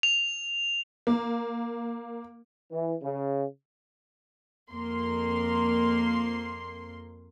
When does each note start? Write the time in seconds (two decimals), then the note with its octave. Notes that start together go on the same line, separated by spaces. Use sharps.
0.03 F7
1.07 A#3
2.69 E3
3.02 C#3
4.71 F2 A#3 C6